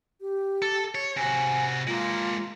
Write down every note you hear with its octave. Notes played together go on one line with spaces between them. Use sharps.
G4
A4
C#5
C3 F#4 G#5
G#3 A#3 F4